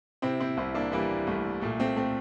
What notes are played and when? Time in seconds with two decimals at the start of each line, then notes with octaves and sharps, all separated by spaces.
0.22 C3 C4 E4
0.41 C4 E4
0.57 C2 C4 E4
0.74 A#3 D4
0.92 E3 G3 A#3
1.20 G3
1.27 C2 A3
1.62 A#2 A3
1.79 A3 C4
1.96 A3 C4